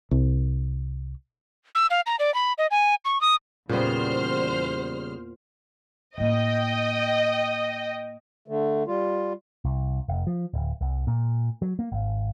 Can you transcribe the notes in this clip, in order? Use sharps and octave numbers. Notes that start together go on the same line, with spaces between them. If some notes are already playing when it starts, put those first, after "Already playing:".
C2
E6
F5
A#5
D5
B5
D#5
G#5
C#6
D#6
E2 A#2 C#3 G3 B3 C5 F6
A2 A#3 D#5 G5
D3 A3
G3 F4
C2
F1
F3
D1
C2
A#2
F#3
A#3
G#1